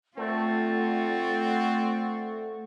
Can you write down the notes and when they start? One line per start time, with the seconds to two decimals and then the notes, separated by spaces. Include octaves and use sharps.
0.17 A3 C4 F4 D5 F#5 C#6